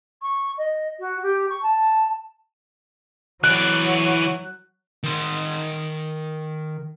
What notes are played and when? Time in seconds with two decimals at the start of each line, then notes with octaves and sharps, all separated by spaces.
0.22 C#6
0.58 D#5
1.00 F#4
1.23 G4
1.50 C#6
1.63 A5
3.44 E3 F#3 D5 F#6
5.04 D#3 C6